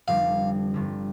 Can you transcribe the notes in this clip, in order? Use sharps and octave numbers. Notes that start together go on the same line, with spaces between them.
F1 F2 D3 G3 F5
G1 G2 D3